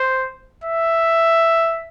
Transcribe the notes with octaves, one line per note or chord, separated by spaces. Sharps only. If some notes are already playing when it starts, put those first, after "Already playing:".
Already playing: C5
E5